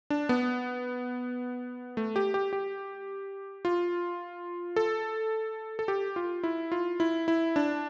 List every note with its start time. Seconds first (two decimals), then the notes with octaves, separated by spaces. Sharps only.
0.10 D4
0.29 B3
1.97 A3
2.16 G4
2.34 G4
2.53 G4
3.65 F4
4.76 A4
5.79 A4
5.88 G4
6.16 F4
6.44 E4
6.72 F4
7.00 E4
7.28 E4
7.56 D4